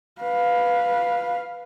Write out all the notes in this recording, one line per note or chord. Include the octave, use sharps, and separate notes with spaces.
B4 F5